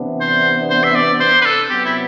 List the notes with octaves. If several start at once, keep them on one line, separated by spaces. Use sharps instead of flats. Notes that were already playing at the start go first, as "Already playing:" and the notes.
Already playing: C3 E3 B3 D4
C5
C5
E5
D5
C5
B4
A4
C3 F#3 B3 G4
E4